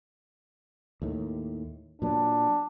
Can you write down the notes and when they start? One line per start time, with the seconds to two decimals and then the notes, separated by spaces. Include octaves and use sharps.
1.02 D#2 A2 D#3
2.02 A#2 F#3 B3 D4